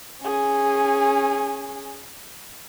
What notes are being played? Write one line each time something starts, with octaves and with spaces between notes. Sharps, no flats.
C#4 G#4